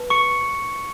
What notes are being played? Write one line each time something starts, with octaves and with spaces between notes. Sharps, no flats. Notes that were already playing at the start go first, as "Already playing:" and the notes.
Already playing: B4 A5
C#6 C#7